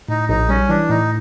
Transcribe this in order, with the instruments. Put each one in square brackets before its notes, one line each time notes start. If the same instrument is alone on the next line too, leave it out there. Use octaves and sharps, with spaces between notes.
[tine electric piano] A2 [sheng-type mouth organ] D#4
[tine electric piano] A#1 [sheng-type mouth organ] D#4
[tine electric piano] G3 [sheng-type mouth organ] C#4
[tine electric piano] E3 [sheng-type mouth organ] D4
[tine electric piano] A2 [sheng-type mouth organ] D#4